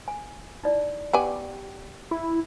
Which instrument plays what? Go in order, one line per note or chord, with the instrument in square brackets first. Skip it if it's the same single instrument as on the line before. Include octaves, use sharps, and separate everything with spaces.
[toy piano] G#5
D#4 E4 D5
[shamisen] B3 D5 G#5 [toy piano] G4 G5
[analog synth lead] E4